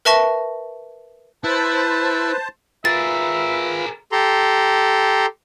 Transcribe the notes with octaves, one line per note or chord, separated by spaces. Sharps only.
A#4 B4 E5 A5 C#6 A#6
E4 B4 C5 A5
F4 G#4 A#4 B4 E5 A6
G4 A4 A#5 C6